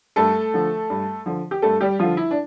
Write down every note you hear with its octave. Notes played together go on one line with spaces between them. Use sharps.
G2 A3 A4
D3 F3
G2
D3 F3
G4
G2 A3 A4
G3 G4
D3 F3 F4
E4
D4